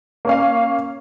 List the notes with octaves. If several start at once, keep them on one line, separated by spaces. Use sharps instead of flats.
A#3 C#4 F5